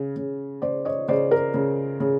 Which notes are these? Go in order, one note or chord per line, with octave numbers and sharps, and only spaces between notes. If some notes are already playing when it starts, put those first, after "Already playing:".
Already playing: C#3
C#3
C#3 C5 D5
C#5 D#5
C#3 C5 D5
A#4
C#3
C#3